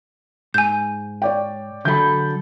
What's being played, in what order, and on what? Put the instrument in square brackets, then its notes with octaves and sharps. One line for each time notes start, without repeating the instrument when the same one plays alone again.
[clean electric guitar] G#2 [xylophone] G#5 G6
[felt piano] C#5 D5 G5
[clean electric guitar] D3 F#3 A4 [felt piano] B5 G6